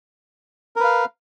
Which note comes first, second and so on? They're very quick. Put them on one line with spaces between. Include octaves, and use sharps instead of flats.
A#4 B4 F5